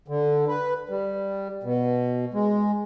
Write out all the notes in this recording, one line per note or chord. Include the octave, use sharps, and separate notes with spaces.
D3
B4
G3
B2
G#3